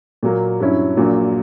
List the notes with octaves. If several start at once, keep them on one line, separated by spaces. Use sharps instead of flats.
A#2 F#3 A#3
G2 F#3 C#4 E4
A#1 A#2 F#3